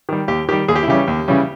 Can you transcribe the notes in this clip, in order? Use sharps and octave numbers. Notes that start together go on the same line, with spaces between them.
D#3 G3
D#2 G4
D#3 G3 G4
D#2 G#4
G4
E4
C#3 E3 G3 C#4 G4
D#2
C#3 E3 G3 C#4